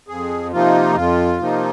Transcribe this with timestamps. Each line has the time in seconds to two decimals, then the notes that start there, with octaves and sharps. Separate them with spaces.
0.08 F2 G#4
0.52 C3 F3 A#3 D#4 F4
0.95 F2 F4
1.39 C3 F3 A#3 D#4